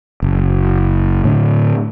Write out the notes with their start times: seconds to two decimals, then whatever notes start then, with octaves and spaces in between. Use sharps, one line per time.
0.22 F#1
1.24 A2 D3